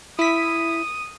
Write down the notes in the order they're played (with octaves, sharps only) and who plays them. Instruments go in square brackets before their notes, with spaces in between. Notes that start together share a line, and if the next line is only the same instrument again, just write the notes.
[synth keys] E4 B6 [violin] D#6